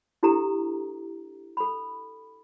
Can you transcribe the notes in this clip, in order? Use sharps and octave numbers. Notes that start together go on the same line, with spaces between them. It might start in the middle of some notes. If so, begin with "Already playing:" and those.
D4 E4 G4 A4 A#5
A4 B5